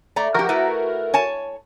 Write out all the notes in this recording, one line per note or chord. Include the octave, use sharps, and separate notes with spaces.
A3 D5 A#5
F3 F#4 G4 A#4
A3 E4 B4
C#5 G#5 A5